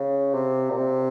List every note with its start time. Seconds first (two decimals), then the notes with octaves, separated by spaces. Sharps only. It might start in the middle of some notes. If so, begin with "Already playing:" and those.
Already playing: C#3
0.34 C3
0.70 A#2
0.78 C3